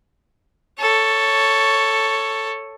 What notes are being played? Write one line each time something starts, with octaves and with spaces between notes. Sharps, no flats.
A4 C#5